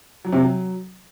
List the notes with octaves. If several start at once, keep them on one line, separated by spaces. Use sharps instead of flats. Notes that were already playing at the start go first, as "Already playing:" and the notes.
F#3
C3
F#3